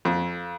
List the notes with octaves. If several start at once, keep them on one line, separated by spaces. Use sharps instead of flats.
F2